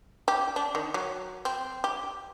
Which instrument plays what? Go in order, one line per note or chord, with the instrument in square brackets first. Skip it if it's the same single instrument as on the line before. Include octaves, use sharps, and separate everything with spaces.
[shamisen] G4
D4
D#3
F#3
C4
G4